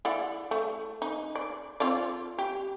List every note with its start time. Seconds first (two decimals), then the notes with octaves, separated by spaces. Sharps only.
0.05 E4 D5 F#5
0.51 A3
1.02 D#4
1.35 D5
1.80 C4 F4 D5
2.38 G4